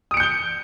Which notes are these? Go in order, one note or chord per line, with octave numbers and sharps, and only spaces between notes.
D#6 G6 C#7 D7 G7